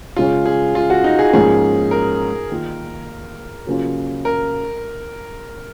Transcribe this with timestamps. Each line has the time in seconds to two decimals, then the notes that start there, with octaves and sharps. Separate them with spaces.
0.16 C#3 G#3 C#4 F4
0.46 G#4
0.75 F4
0.90 F#4
1.04 D#4
1.19 G#4
1.33 G#2 F3 A#3 C#4 G#4
1.91 A#4
2.50 D#3 A#3 F4
3.67 C#3 F#3 A#3 C#4 F4
4.25 A#4